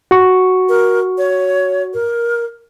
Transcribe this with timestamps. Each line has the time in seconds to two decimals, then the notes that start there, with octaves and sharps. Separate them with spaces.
0.11 F#4 C#6
0.69 A#4
1.18 C#5
1.94 A#4